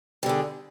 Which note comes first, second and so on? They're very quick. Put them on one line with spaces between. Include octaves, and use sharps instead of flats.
G3 D3 E2